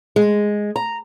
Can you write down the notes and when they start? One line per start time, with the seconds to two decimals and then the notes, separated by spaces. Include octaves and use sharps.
0.16 G#3
0.76 A#5